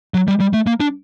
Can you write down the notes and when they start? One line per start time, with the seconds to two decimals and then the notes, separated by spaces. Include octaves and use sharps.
0.14 F#3
0.28 G3
0.40 G3
0.53 A3
0.67 A#3
0.80 D4